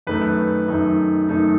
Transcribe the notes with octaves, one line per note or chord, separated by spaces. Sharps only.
F#2 D#3 A3 D#4 B4
F#2 D#3 A3 D#4
F#2 D#3 A3 D#4